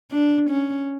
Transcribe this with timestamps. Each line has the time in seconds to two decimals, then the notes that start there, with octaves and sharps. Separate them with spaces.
0.11 D4
0.50 C#4